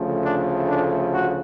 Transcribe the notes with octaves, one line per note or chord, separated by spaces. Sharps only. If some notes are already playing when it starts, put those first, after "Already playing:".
Already playing: D2 C#3 F3 A3
D4
D4
F#4